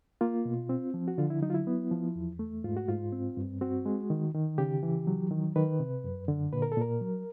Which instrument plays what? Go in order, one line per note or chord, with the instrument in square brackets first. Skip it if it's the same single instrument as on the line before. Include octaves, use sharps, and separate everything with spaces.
[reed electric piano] A#3 F4
B2
C4
F3
F#4
D3 F4
E4
F#3 D#4
F4
E4
B3
F3
E2
A3
G#2 F4
F#4
G#2 F4
C4
G2
C4 F#4
G#3
D#3
D#3
C#3 G4
E3
F#3
D#3
D#3 B4
C3
F#2
D3
A#2 B4
A#4
A4
A#2 A#4
F#3